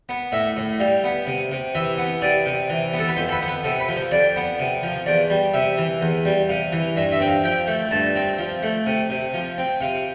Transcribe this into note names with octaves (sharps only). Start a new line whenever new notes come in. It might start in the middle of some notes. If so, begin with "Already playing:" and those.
B3
A2 E5
A2
G3 F5
B3
C3
C3
E3 E5
B3
C3 D5
C3
E3
B3
A4
B4
F2 C5
A4
B4
B3
B4
C3 A4
B4
F3
C5
F2 D5
B3
C3
F3
E2 D5
G3
C3 E5
E3
E2
G3
C3 F5
E3
G2 E5
E5
C4
F5
F3 G5
A3
G2 A5
C4
F3
A3
C3
C3
F3
C4
C3 F5